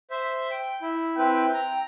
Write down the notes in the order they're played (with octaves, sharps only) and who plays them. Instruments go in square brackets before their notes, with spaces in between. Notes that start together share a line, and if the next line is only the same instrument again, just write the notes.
[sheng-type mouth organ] C5 E5
G5
E4
[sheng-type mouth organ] C4 E4 B4 [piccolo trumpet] G5
[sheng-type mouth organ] A#5